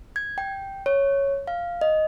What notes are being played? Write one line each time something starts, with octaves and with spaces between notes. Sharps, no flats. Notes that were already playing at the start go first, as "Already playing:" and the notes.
G#6
G5
C#5
F5
D#5